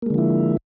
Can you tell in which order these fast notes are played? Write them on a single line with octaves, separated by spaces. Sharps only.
A#3 G#3 D3 F3 E4